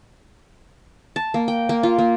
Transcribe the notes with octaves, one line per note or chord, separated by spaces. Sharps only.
A5
A#3
G5
A#3
F4
A#3